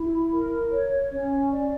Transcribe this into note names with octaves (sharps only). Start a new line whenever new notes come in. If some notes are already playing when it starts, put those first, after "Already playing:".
Already playing: E4
A#4
C#5
C#4
D5